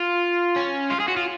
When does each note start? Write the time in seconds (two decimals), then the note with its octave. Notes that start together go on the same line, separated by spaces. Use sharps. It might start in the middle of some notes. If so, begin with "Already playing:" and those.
Already playing: F4
0.56 C#4
0.90 F4
1.00 G#4
1.08 F#4
1.17 F4